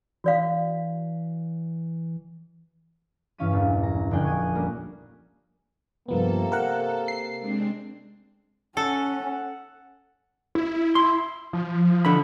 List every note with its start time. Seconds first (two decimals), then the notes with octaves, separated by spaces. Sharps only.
0.24 E3 F#4 D5 F5
3.38 G2 E3 C#4 F5 B6 D#7
3.53 E1 A#1
3.83 A#5
4.11 F1 D3 D4 G5 G#5 F#6
4.25 C#6 D#6 G#6 D#7
4.55 G3 A#3 C#4 D4
6.08 G2 C3 F3 A#3 B3 A4
6.52 A#4 F#5
7.08 C7
7.40 G#3 C4 D4
8.77 C#4 A4 F#5
10.55 E4
10.95 C6
11.53 F3
12.05 D3 B5